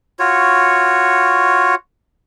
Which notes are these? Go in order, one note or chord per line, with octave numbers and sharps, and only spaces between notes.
F4 F#4 C#5